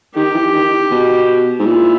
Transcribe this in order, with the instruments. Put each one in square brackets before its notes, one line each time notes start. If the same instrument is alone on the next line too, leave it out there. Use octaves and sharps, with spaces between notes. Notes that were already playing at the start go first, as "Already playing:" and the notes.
[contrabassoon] D#3 [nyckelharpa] G4
[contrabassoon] E3
D#3
B2
G#2
[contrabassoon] A#2 [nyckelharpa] E4